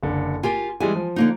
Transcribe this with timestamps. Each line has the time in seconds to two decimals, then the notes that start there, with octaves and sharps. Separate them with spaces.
0.03 F#1 D3
0.43 F4 G4 A#4 G#5
0.80 E3 G3 G#3 G#5
0.96 F3
1.16 D3 A#3 D#4